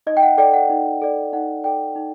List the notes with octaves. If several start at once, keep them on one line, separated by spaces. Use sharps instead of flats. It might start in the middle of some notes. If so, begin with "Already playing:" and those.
D#4 D#5
G5
F#5
A4 D5 G5
F#5
D#4
A4 D5
D#4 F#5
A4 D5 G5
D#4